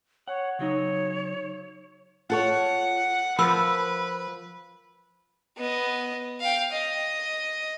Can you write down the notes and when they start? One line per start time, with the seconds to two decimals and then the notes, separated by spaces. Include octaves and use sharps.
0.28 C#5 F#5
0.59 C#3 F#3 D#4 C#5
2.30 F4 A4 C#5 F#5
3.39 F3 A#4 B4 B5 E6
5.57 B3 D#5
6.41 F5 G5
6.72 D#5